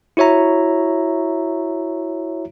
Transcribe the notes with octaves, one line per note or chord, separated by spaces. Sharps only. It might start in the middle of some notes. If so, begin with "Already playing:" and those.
E4 F#4 C#5 E5 A#5